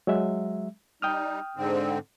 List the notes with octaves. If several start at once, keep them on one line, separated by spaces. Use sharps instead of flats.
F#3 G#3 E5
G3 D#4 G5 D#6 F6
G#2 D3 C4